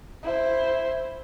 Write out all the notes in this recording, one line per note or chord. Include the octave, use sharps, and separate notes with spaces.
E4 C5